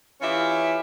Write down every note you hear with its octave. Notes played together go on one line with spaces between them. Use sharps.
E3 F4 G4 C#5 E5